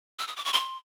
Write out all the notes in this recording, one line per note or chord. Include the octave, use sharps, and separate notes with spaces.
E6
D#6
D6
C#6
C6